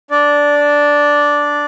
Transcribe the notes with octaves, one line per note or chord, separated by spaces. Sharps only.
D4 D5